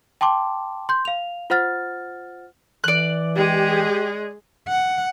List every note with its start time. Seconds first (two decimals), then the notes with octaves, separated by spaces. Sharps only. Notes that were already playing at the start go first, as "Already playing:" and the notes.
0.21 G5 A5 C6 D6
0.89 C6 G6
1.05 F5 F7
1.50 F4 C5 F#5 F6 A6
2.84 E3 D5 F#6
3.36 G#3 G4 G#4
4.69 F#5